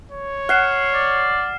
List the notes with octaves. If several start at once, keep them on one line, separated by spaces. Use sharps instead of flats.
C#5
F#5 F6 C7 E7
D5